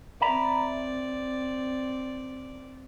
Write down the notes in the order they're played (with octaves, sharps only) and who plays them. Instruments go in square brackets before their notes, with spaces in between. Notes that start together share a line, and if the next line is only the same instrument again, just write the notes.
[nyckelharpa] C4 D5 [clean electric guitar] E5 A#5 B5